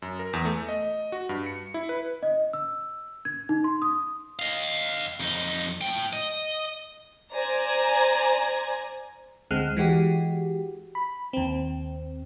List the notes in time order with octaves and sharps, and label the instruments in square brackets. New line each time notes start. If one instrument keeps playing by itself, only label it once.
[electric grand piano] F#2
A#4
E2
A3
D#5
F#4
G2
C#7
E4
B4
[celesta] D#5
E6
G#6
D#4
C6
D#6
[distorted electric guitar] D#5 F5
F2 D#4
A2 G5
D#5
[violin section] C5 D5 G#5 A#5
[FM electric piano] D2 G#3 C4 F6 F#6
E3 G#3 F#4 G4
B5
D#2 C4